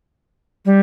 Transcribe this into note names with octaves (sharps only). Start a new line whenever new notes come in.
G3